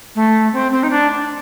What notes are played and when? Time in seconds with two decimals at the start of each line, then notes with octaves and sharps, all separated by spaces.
0.15 A3
0.53 C4
0.71 C4
0.83 D#4
0.90 D4